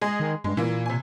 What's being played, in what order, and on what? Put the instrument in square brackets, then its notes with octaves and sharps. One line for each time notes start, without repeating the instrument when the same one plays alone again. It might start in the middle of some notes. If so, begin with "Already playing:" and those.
[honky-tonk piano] G#3 G#4 D#5
[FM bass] D#3
[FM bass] G2 [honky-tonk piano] G#3
[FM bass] A#2 [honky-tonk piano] E3 A#3
[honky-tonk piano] C3 G#5